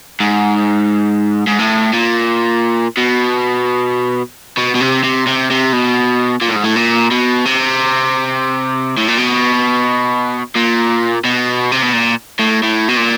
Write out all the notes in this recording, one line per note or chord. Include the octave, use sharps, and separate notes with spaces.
G#2
G#2
A2
A#2
B2
B2
B2
C3
C3
C3
C3
B2
A#2
A2
G#2
A2
A#2
B2
C3
A2
A#2
B2
A#2
B2
C3
B2
A#2
A2
A2
B2
A#2